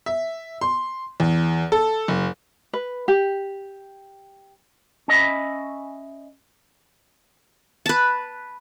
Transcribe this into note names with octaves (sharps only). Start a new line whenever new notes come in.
E5
C6
E2
A4
F#1
B4
G4
C#4 D#5 E5 B5
B4 A5